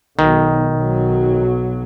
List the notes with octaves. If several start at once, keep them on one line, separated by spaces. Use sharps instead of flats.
B1 D#3
B1 F#3